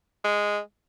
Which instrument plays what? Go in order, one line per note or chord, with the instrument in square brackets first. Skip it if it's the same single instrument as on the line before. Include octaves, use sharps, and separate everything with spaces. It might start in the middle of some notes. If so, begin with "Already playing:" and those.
[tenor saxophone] G#3